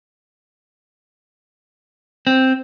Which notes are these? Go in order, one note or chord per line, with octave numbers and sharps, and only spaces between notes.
C4